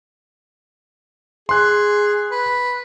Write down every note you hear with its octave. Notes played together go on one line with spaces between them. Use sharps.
G#4 C6 F#6
B4